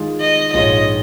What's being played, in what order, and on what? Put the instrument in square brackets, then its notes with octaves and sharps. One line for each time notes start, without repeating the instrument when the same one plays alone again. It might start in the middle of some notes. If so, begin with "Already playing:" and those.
Already playing: [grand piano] D#3 G#3 F4 G#4
[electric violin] D#5
[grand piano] A#1 G#2 G#3 F4 C#5 [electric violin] D#5